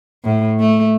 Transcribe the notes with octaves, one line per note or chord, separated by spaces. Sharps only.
A2
A3